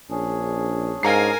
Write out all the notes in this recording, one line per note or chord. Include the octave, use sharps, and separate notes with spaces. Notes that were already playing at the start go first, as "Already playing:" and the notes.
A#1 C#4 D4 G#4
G#2 A#4 F5 G#5 A#5 C7